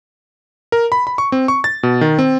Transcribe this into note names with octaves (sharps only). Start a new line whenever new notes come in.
A#4
B5
B5
C#6
C4
C#6
A6
B2
D#3
C4